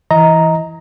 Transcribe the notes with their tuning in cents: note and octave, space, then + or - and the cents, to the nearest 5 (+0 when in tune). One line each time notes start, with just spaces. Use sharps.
E3 +0 D#5 +25 A#5 +0